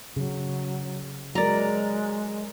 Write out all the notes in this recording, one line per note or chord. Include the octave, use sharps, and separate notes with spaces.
C#3 F#3 G#4
F#3 G#3 A#4 D5 A#5